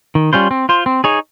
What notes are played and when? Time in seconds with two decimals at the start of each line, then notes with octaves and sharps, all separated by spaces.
0.15 D#3
0.33 G3 C#4 F4 C5
0.51 C4
0.69 F4 C5
0.86 C4
1.04 D#4 G#4 C#5